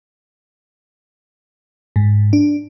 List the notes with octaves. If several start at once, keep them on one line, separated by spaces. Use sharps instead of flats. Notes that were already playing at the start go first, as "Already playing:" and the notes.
G#2
D4